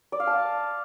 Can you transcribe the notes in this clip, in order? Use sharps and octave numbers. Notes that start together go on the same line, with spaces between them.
D5
F5
A5